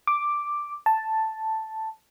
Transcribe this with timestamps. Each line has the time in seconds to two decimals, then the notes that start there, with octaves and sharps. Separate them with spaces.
0.07 D6
0.86 A5